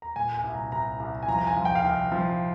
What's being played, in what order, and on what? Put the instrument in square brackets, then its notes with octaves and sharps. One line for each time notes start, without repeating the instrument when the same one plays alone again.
[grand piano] A#5
A#2 G#5
G#5
C2
A#5
C2 A#5
C2
G#5
F3 A#5
A#5
G#5
F3
G5
F5
C2 G5
F3